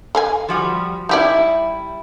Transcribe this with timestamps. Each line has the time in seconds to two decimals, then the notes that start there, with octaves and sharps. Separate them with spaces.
0.15 A4 F5 G#5
0.48 F3 G3 F#4
1.09 G3 D#4 E4 G4 D5